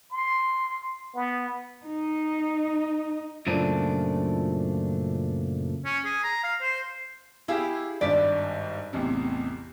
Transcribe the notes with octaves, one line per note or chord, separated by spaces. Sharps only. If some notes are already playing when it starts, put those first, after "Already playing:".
C6
B3
D#4
F#2 A#2 C#3 F3 A3 D4
C#4
G#4
A#5
F5
C5
E4 G4 G#4 F5
G#1 G2 D5 B6
A1 E2 C3